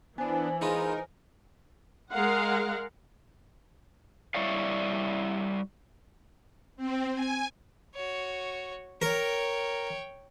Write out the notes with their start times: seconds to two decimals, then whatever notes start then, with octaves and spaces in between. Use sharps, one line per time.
0.18 E3 B3 D4 C5 G#5
0.61 G#3 B3 D#4 F4 A#4
2.10 G#3 A#4 F5 F#5
4.35 G3 E4 C#5 D5 F5
6.77 C4
7.14 G#5
7.95 F#4 C#5
9.02 A#4 C#5 G5